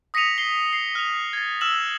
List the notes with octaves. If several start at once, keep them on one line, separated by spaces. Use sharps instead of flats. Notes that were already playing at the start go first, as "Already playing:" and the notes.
D#6 A#6 B6 C#7 D#7 F7
B6 C7 G7
C7
F6 F7
G#6 A6
E6 F6 E7 F#7